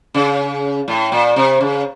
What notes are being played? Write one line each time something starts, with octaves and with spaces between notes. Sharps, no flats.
C#3
A2
A#2
C3
C#3